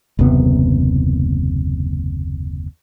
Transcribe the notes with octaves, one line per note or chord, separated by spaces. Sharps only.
F#1 D#2 C3 B3